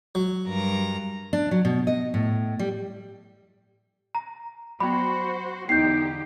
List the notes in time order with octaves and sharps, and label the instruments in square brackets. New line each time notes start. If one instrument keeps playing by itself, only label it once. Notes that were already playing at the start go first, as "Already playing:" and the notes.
[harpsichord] F#3
[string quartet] G2 A#4 A#5
[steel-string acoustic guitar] D4
F#3
B2
D#5
A2
G3
[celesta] A#5
[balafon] F#3 B3 [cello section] F#4 C5 [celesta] B5
[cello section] E2 D3 G4 [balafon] B3 [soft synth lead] D#4 [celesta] G6 C7